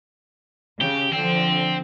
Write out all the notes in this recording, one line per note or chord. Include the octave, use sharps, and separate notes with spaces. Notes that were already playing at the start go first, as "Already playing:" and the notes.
C#3 G4
D3 F3 C4